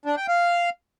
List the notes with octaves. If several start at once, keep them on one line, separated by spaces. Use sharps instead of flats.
D4
G5
F5